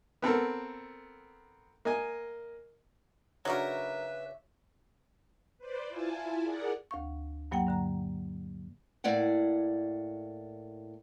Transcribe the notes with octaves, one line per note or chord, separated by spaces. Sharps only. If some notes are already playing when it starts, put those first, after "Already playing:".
B3 C4 A4 A#4
A#3 D#5 G#5
C#3 F#3 D4 D#4 F#4 A#4 B4 E5
B4 C5 D5
E4 F4 G#5 A5
G#4 A#4 D5 F#5
D2 F5 C#6
G2 F#3 A#3 F#5 G5
G2 D3 A#5
A2 A#3 D5 F#5